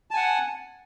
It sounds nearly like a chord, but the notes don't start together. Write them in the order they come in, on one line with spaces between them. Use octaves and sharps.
A5 G#5 F#5